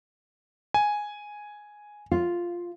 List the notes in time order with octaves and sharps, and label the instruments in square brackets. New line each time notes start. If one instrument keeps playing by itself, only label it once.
[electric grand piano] G#5
[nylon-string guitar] F4